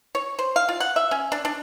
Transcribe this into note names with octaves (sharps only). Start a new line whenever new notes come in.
C#5
C5
F5
F4
F#5
E5
C#4
D4
D4